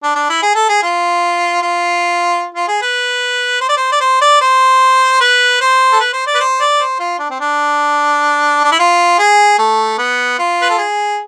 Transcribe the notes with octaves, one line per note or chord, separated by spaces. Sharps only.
D4
D4
E4
G#4
A4
G#4
F4
F4
F4
G#4
B4
C5
D5
C5
D5
C5
D5
C5
B4
C5
A4
B4
C5
D5
B4
C5
D5
C5
F4
D4
C4
D4
D4
E4
F4
G#4
A3
B3
F4
B4
A4
G#4